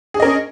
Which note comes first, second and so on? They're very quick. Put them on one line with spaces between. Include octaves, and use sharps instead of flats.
G#4 D4 D#5 A#4 C#4